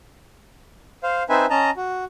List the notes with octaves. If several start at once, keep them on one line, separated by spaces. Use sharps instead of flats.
C5 F5
C4 D#4 B4 C5 E5 G#5
C#4 D#5 A5 A#5
F#4